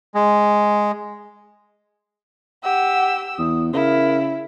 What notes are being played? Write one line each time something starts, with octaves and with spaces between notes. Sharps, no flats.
G#3
G4 F#5 E6
E2 D#6
C#3 E4 A#4